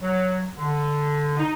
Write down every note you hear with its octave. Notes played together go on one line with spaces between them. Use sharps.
F#3
D3
D#4